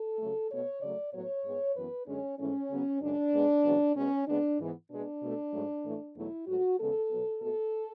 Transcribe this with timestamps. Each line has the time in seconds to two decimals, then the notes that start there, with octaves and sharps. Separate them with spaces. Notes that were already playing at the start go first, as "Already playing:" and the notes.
Already playing: A4
0.18 C#3 F#3 A3
0.50 B2 A3 C#5
0.82 C#3 F#3 A3 D5
1.13 A2 F#3 B3 C#5
1.44 G#2 G#3 B3
1.75 F#2 E3 B3 B4
2.07 F#2 D3 G#3 C#4
2.39 G#2 E3 A3 C#4
2.70 C#3 F#3 B3
3.02 F#2 C#3 G#3 D4
3.33 G#2 G#3 B3
3.64 E2 C#3 F#3 B3
3.95 B2 G#3 B3 C#4
4.27 C#3 G#3 B3 D4
4.59 G#2 E3 B3
4.90 B2 G#3 B3 D4
5.22 B2 A3
5.53 G#2 F#3 A3
5.85 A2 E3 A3
6.15 E2 B2 F#3 A3 E4
6.47 G#2 F#3 A3 F#4
6.79 E2 C#3 G#3 B3 A4
7.10 B2 F#3 B3
7.41 B2 A3 A4